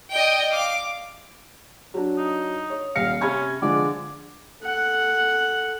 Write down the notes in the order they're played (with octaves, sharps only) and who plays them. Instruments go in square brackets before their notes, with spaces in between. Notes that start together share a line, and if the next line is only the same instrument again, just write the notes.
[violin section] D5 D#5 G5
F5 D6
[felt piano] F#3 D4
[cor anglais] D#4
[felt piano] C#5
[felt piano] D#1 A#6 C#7 [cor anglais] F5
[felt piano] C3 B5 G#6 [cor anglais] C#4
[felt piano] D3 F3 G#3 [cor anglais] D5
[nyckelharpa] A4 F#5